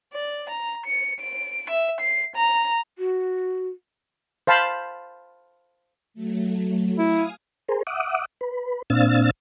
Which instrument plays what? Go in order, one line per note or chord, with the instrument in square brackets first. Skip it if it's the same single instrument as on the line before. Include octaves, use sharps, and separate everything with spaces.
[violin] D5
A#5
C#7
D7
E5
C7
A#5
[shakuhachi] F#4
[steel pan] C5 F5 A5 B5
[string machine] F#3 A3
[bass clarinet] E4 [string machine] F5 G#5 D#6
[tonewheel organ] G#4 A#4 C5
E5 F#5 D6 D#6
B4
A#2 C4 D4 F5 E6 A6